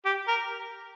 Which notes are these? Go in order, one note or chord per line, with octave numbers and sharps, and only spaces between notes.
G4
A#4